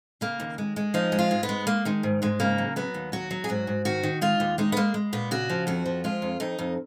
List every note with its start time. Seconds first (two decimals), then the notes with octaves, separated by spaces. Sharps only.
0.21 C#3 A#3
0.40 D#2
0.58 G#3
0.76 G#3
0.94 F3 D#4
1.12 G#3
1.19 F4
1.31 G#2
1.43 B3
1.49 G#3
1.67 G#3 A#3
1.85 D#3 G#3
2.03 G#2
2.22 G#2 G#3
2.40 C#3 A#3
2.58 F#3
2.76 F#3 B3
2.94 D#2
3.12 F#3 F#4
3.31 F#3
3.44 G#4
3.49 G#2 F#4
3.67 G#2
3.85 D#3 F#4
4.03 D#3
4.21 G#3 F4
4.40 D#2
4.58 G#3 D#4
4.72 B3
4.76 G#3 A#3
4.94 G#3
5.13 A#2 B3
5.31 C#3 F#4
5.49 F3
5.67 F2 F#4
5.86 F3
6.04 G#3 F4
6.22 F2
6.40 F2 D#4
6.59 F2